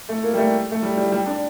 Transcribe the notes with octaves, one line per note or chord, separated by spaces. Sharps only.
A3
A#3
G3
A3
A3
G3
G3
G3
D4